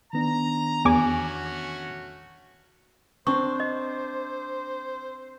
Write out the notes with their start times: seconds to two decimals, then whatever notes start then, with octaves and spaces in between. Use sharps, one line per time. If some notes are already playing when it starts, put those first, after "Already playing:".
0.13 D#3 B3 D4 A#5
0.85 E2 A3 C#4 F#4 G#5 D6
3.27 C4 D4 C5 C#6
3.60 D#5